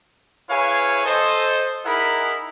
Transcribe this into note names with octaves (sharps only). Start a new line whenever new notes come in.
E4 G#4 B4 C#5 F5 G#5
A4 C5 D#5
D#4 E4 G#4 A#4 F#5 B5